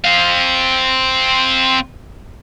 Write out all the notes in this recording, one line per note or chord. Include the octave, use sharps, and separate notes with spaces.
C4 F5